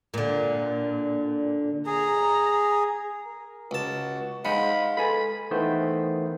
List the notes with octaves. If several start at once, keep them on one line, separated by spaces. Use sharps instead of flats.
A#2 D3
G#4 A#5
A#4
C#2 F#4 A5
G#3 D#4 C5 F5 F#5 B5
A4 B4 G#5 B5
D#3 E3 A3 B3 C5